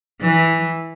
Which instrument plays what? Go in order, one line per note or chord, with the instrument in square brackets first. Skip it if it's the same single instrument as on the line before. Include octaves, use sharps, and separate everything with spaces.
[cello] E3